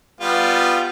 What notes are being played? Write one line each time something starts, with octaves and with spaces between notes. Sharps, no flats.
G3 B3 F4